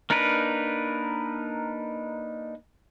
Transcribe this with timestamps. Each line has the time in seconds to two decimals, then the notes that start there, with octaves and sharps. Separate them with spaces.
0.10 A#3 D4 D#4 A#4 B4